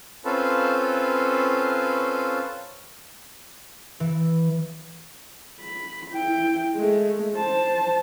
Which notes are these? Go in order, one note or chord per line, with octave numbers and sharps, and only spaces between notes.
C4 C#4 F4 A4 B4
E3
B5
E4 G5
G#3 A3
C5 A5